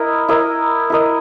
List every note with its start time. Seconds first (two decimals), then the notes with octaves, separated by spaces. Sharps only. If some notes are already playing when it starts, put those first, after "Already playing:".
Already playing: E4 A#4 D#5
0.28 E4 A#4 D#5
0.90 E4 A#4 D#5